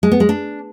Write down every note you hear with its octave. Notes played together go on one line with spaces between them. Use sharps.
G#3
B3
G#3
D4